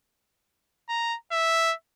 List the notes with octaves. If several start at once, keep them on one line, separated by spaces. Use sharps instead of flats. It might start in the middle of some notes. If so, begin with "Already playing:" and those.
A#5
E5